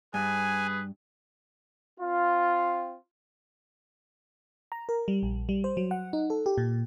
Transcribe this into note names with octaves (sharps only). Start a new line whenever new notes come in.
G2 G#4 B4 G#5
C4 F4
A#5
A#4
G3
A#1
G3
C5
F#3
F#5
D#4
A4
G4
A#2